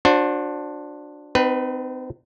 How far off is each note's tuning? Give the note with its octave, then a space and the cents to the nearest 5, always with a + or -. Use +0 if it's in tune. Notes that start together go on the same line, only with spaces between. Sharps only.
D4 +5 F#4 -30 C5 +25
C4 -40 D#4 -25 B4 +0